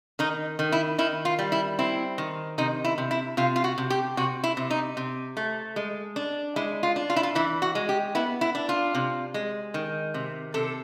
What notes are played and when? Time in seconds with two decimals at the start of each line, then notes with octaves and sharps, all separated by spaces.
0.19 D#3 D#4
0.59 D#3
0.72 E4
0.98 D#3 E4
1.25 F4
1.39 G3
1.52 E4
1.79 C4 E4
2.18 D#3
2.58 C3 D#4
2.84 E4
2.98 C3
3.11 E4
3.37 C3 F4
3.56 F4
3.64 F#4
3.78 C3
3.90 G4
4.17 C3 F#4
4.44 E4
4.57 C3
4.71 D#4
4.97 C3
5.37 A3
5.76 G#3
6.16 D4
6.56 G#3 E4
6.83 F4
6.96 D4
7.10 F4
7.16 E4
7.23 F4
7.35 E3 E4
7.62 F#4
7.75 G#3
7.89 G4
8.15 B3 E4
8.41 E4
8.55 D4
8.69 F4
8.95 C3
9.34 G#3
9.74 D#3
10.14 C3
10.54 C3 A4